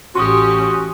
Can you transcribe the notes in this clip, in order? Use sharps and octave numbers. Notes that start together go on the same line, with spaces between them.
A1 C#4 F#4 G4 C6 D#6